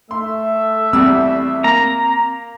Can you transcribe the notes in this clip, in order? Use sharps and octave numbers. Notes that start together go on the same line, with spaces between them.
A3 E5 C6
E2 G3 C4 E6
A#3 A#5